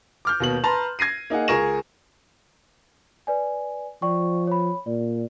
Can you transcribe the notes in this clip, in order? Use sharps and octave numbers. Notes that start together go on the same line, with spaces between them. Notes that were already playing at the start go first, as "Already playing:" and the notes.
D6 F6 G6
D#2 B2 F#7
B4 A5 A#5 C6
G#6 A#6 C7 D#7
A#3 D#4 G#4 F#5
C#2 G#4 A#4 C#6 A#6 E7
B4 D5 G#5
F3 D5 G5 C#6
C#5 B5
A#2 D5